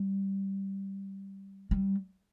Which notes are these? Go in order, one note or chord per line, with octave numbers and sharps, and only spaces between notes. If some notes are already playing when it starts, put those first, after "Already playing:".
Already playing: G3
G3